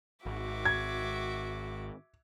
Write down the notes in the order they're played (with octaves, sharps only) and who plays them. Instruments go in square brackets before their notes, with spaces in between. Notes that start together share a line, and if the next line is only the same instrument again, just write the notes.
[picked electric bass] G#1 [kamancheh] F#4 [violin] E5 D6
[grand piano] G#6